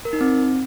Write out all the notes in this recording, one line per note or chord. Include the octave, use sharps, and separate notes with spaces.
A#4
D#4
C4